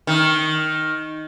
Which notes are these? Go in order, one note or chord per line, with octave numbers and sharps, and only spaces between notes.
D#3